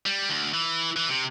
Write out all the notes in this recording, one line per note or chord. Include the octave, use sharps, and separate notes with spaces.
G3
D2
E3
E3
C3